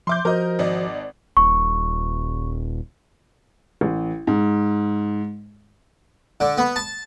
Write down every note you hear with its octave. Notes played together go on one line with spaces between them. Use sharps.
F3 E5 C6 D6 G6
F3 F#4 A#4 C5 D#5
G#1 D5 D#5
D#1 C#6
A1
G#2
D3
B3
A5